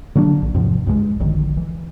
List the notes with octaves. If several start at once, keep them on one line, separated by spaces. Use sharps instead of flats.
D3 F#3 A#3 D4
A#1
E2 G#2 C3 F3
C#2 G2 G3 G#3
D#1 A#1 D3 D#3
E3